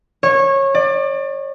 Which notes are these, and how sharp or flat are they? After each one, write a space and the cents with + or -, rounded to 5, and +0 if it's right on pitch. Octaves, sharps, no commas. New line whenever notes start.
C#5 -20
D5 +25